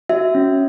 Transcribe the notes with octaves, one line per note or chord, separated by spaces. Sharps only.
F#4 E5
C#4